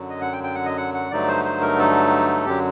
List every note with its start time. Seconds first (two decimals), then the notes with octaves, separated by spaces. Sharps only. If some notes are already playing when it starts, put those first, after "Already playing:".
Already playing: F#2 D3 F#3
0.10 D#5
0.21 F#5
0.33 G5
0.43 G5
0.55 F#5
0.65 D#5
0.77 F#5
0.94 F#5
1.11 G2 D3 F#3 A3 D#4 D5
1.28 C5
1.45 C5
1.61 A#4
1.79 A4
2.46 F#2 D3 F#3 G4